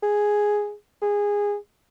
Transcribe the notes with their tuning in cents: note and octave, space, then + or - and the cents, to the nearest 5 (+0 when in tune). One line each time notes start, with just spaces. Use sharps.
G#4 +0
G#4 -15